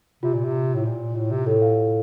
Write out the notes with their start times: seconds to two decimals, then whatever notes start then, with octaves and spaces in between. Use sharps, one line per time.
0.23 C3 F4
0.34 A#2
0.45 C3
0.74 A2
0.85 A#2
1.15 A2
1.31 C3
1.46 A2 A4
1.62 F5